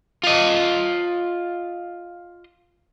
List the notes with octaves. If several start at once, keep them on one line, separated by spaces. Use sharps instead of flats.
F4 D#5